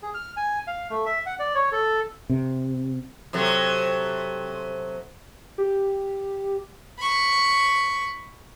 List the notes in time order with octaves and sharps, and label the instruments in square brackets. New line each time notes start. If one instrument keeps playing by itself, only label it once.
[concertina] G#4
F6
G#5
F5
A3
E5
F#5
D5
C#5
A4
[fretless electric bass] C3
[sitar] C3 F#3 A3
[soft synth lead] G4
[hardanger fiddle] B5 C#6